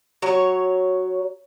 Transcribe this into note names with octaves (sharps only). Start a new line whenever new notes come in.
F#3 C#5